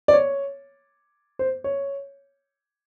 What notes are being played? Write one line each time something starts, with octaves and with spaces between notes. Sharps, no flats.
D5
C#5
C5
C#5